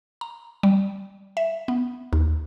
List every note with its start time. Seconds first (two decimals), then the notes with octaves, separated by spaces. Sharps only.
0.21 A#5
0.63 G3
1.37 E5
1.68 B3
2.13 D#2